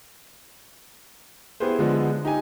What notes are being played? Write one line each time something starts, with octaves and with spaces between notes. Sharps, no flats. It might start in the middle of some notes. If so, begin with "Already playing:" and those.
B3 E4 G4 G#4 B4 C5
D3 F3 G#3 B3 D4
D#4 G4 G#5